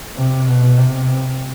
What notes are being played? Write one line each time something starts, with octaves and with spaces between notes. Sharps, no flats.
C3
B2
C3